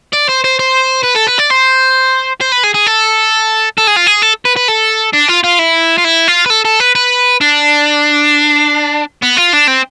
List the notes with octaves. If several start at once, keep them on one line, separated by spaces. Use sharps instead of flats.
D5
C5
C5
C5
B4
A4
B4
D5
C5
C5
B4
G#4
G#4
A4
A4
G#4
F4
G#4
A4
B4
B4
A4
D4
F4
F4
E4
F4
E4
F4
B4
A4
A4
B4
B4
D4
B3
F4
D4
C4